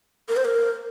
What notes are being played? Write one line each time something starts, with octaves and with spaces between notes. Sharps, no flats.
A#4
C5
A#4